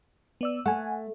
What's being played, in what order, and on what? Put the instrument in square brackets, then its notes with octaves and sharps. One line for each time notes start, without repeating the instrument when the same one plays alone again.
[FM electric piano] B3 D5 E6
[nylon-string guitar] A3 [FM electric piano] F#5 G#5